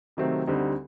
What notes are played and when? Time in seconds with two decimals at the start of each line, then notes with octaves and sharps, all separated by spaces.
0.17 C3 D#3 F#3 A3 C4
0.47 D2 D3 G3 C4 D#4